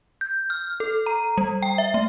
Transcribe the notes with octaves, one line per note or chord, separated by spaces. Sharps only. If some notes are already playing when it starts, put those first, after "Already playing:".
G6
F6
A4
A#5
G3
G5
E5
A3